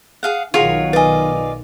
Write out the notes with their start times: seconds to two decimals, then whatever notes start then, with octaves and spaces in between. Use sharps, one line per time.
0.23 G#4 F5 F#5
0.54 B1 D#3 F4 F#4 G#4 C#5
0.93 B4 D5 D#5 G#5